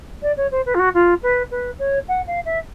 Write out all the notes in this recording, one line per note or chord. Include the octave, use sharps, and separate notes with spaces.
D5
C#5
C5
B4
F4
F#4
F4
B4
B4
C#5
F#5
F5
E5